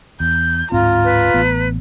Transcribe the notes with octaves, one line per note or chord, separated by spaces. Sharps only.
E2 G6
D1 G#2 C4 F4 A#5
B4
A1 B3